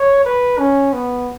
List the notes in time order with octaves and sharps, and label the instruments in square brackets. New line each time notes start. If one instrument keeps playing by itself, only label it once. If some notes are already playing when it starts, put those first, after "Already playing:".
Already playing: [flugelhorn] C#5
B4
C#4
B3